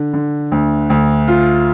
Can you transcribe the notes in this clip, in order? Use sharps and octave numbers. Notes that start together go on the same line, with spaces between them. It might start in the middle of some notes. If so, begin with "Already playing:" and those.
Already playing: D3
D3
D2
D2
F4